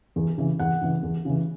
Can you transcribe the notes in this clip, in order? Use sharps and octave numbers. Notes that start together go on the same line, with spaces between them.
E2
C#3 E3
E2 F#5
C#3 E3
E2
C#3 E3